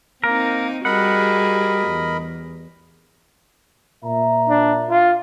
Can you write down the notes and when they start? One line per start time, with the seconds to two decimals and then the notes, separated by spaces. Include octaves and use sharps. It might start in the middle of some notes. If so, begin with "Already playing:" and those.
0.24 A#3 C4 D#4 A#4
0.85 G3 F#4 G#4 A#4 D#5 F#5 B5
1.88 E2
4.03 A#2 E5 A#5
4.49 D4
4.90 F4